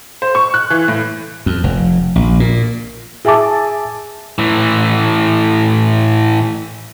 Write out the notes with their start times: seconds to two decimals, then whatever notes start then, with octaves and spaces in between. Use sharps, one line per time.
0.22 C5
0.35 C#6
0.54 F#6
0.70 E3
0.88 A2
1.46 F2
1.64 F1
2.16 A#1
2.40 A#2
3.25 G#4 E5 G#5 A5 D6
4.38 A2 E3